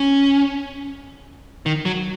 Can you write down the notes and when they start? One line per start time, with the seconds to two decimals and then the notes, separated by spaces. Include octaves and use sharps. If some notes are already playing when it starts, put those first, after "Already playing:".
Already playing: C#4
1.66 D#3
1.85 F#3